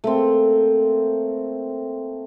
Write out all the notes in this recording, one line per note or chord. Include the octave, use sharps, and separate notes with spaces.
A3 A#3 C4